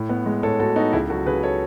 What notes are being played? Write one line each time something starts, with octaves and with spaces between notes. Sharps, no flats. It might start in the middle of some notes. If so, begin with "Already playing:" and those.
Already playing: A2
B3
G#3
A2 A4 C#5
A2 F#4 A4
B3 D#4 F#4
C#2 E4 G#4
F#3 F#4 A4
C#3 G#4 B4
A4 C#5